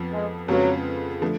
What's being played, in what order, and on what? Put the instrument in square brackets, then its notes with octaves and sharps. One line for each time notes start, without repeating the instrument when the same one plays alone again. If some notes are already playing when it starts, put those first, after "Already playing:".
Already playing: [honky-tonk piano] F2 F3 B3
[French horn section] G#3
[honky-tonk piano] F2 C#3 G#3 B3 F4 [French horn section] F#3
[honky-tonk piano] D3 F3 A3